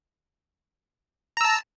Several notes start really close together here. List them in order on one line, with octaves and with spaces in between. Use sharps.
A#5 E6 A5